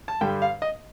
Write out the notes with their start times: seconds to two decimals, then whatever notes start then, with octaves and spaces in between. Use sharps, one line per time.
0.08 A5
0.21 G2 D3 G3 G5
0.42 F5
0.62 D#5